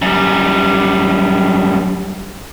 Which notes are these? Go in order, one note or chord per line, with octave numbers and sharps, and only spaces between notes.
F#2 G3